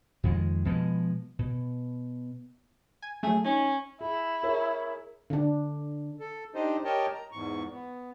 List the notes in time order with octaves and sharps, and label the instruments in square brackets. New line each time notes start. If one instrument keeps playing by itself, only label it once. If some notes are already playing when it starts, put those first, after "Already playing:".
[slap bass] F2 D#3 G#3
B2 F3 G3 G#3
B2
[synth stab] G#5
[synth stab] F#3 A3 [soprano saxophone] G#4
[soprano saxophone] C#4 [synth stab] D#4
[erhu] E4 [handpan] G#4
[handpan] G#4 A#4 C#5
D3 D4
[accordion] A4
D4 D#4 G4 C5 D#5
G4 A#4 C#5 D#5 G5 A5
A#5
E2 G#2 C#6
B3